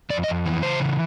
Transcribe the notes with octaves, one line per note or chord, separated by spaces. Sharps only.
F2 D5
D#5
F2
E3
C#3 C5
E3